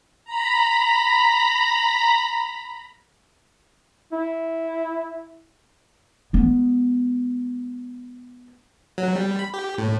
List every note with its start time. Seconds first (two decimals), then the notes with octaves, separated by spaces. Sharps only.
0.25 A#5 B5
4.12 E4
6.33 G#3 B3
8.98 F#3
9.15 G3
9.39 B5
9.54 G4
9.78 A2